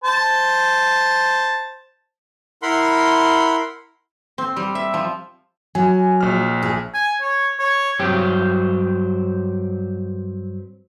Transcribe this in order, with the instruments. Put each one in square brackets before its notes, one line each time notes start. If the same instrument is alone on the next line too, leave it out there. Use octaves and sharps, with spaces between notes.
[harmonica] C5 A5
[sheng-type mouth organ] E4 A#4 F#5 B5 C6
[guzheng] C4
G3
E5
F3
[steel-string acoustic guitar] F#3 [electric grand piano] G#5
[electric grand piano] A#1 F6
[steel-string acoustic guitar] G#4
[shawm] G#5
C#5
C#5
[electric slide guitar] G2 F#3 C4 G4